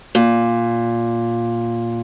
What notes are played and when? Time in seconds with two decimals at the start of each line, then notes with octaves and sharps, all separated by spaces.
0.15 A#2